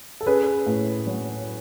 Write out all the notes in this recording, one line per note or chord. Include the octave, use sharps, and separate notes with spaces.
A4
C#4 G#4 B4
A2
F#3